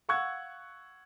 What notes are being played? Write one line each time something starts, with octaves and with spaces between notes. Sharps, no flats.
F5 F#5 C#6 E6 F#6 G#6